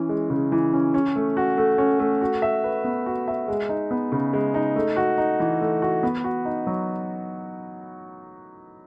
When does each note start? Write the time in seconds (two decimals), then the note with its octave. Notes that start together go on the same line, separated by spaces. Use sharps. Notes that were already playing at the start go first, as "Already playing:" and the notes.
Already playing: E3 C#4
0.09 G#3
0.30 C#3
0.52 E3
0.73 C#4
0.94 C#4
1.16 A3
1.37 F#4
1.57 A3
1.78 C#4
2.00 A3
2.22 F#4
2.42 E5
2.64 B4
2.84 B3
3.06 F#4
3.28 E5
3.48 G#3
3.69 D#4
3.91 B3
4.12 C#3
4.33 G#3
4.54 D#4
4.76 A3
4.96 F#4
5.18 D#4
5.40 E3
5.61 A3
5.82 F#4
6.03 B3
6.24 F#4
6.45 D#4
6.67 F#3